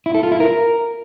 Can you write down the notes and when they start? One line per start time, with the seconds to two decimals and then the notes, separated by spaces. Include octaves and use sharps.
0.06 E4
0.15 A4
0.23 F4
0.32 E4
0.40 A#4